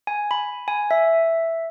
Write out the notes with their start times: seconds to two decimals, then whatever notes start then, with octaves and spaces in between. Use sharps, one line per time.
0.07 G#5
0.31 B5
0.68 G#5
0.91 E5